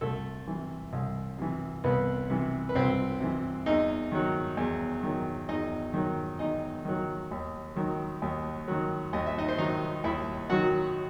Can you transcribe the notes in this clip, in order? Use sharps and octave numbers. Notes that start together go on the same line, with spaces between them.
C2 A3 A4
C3 E3
C2
C3 E3
C2 B3 B4
C3 E3
B4
C2 C4 C5
C3 E3
E2 D#4 D#5
D#3 F#3
E2
D#3 F#3
E2 D#4 D#5
D#3 F#3
E2 D#4 D#5
D#3 F#3
D#2
D#3 F#3
D#2
D#3 F#3
D#2 D#5
E5
D#4 D#5
C5
D#3 F#3 D#4 D#5
D#2 E4 E5
D#3 F#3 F#4 F#5